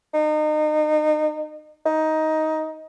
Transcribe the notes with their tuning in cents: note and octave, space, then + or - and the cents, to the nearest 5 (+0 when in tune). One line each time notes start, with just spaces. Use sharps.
D#4 -30
D#4 +15